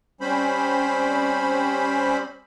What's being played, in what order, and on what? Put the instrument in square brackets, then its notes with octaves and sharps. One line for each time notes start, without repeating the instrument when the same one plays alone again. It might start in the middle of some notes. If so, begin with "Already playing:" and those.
[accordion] G3 C4 C#4 C5 B5